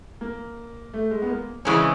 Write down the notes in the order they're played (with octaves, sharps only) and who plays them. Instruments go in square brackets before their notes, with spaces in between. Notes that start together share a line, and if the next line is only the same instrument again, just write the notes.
[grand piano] A#3
A3
G#3
B3
A#3
[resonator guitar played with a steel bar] C#3 E3 G#3 C#4 [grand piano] C4